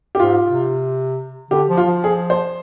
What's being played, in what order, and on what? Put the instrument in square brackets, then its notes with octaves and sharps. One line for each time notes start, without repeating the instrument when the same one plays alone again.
[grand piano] G4
[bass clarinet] G#2 [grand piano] F4
[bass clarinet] C3
[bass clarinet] D3 [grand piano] G4
[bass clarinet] F3
[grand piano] F4
[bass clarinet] F3
[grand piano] G#4
C5